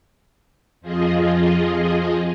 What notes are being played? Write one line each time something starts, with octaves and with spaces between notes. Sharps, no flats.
F2 F3 F4 G#4 D#5